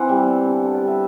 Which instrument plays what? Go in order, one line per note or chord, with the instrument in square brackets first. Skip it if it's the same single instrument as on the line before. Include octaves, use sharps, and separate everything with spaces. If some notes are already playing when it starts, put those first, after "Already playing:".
Already playing: [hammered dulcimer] E3 C4 E5 F#5
G3
B3
D3
D3
D5
G3
E5